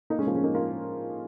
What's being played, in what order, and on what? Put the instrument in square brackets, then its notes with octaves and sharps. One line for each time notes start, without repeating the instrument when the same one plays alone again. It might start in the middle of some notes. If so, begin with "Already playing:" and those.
[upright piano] A#3 D#4
G#3 C#4
F3 A#3
G#3 C#4
A#3 D#4
F4 A#4